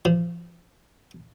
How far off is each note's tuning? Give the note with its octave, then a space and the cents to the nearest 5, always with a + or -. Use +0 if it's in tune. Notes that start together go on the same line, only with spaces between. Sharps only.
F3 -30